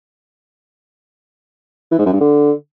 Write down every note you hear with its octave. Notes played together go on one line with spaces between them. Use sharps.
E3
G#2
F#2
G2
D3